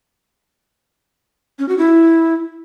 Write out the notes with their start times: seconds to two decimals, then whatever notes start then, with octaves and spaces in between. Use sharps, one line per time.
1.59 C#4
1.69 F#4
1.78 E4